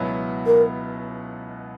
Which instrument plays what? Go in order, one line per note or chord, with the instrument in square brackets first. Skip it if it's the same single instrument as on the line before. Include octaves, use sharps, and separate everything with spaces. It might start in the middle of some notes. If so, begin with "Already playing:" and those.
Already playing: [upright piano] C#2 B2 F#3 B3 E4
[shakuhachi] A#4